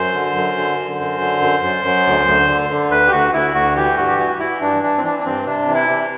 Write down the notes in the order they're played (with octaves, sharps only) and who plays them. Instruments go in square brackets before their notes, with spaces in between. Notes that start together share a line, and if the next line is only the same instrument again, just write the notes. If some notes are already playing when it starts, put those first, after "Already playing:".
Already playing: [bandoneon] F#2 C5
D3
F#2
D3
D3
F#2
D3
F#2
F#2
F#2
D2
D2
D3
D3
D2 B4
G4
D2 F#4
D2 E4
D2 F#4
E3 G4
G2 F#4
G4
E3 F#4
E3 E4
G2 D4
E3 D4
C4
E3 D4
D4
G2 C4
C3 D4
E3
E4
C3